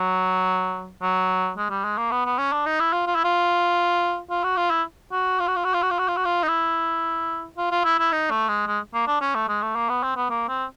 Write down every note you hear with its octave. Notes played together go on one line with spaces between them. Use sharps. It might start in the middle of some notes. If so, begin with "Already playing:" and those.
Already playing: F#3
F#3
G#3
G3
G#3
A#3
B3
B3
C#4
D4
D#4
E4
F4
F4
E4
F4
F4
F#4
F4
E4
F#4
F4
F#4
F4
F#4
F4
F#4
F4
F#4
F4
F#4
F4
D#4
E4
F4
F4
E4
E4
D#4
A3
G#3
G#3
A#3
D4
C#4
A3
G#3
A3
A#3
B3
C4
B3
A#3
C4